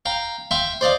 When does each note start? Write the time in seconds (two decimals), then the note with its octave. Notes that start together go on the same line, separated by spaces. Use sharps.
0.05 F5 G5 A#5
0.51 E5 F5 G5 C6
0.81 C5 D5 D#5 F5